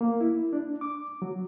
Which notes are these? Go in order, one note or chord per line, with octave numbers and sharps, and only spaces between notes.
A#3
E4
D4
D6
F#3